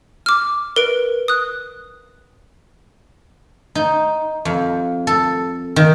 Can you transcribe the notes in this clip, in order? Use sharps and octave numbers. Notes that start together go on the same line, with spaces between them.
D6 F6
A#4 B4 D7
D#6 F#6
D#4
F2
A4
D#3